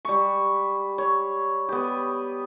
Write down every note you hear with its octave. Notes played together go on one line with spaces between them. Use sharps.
G3 C#6
C#5
B3 G4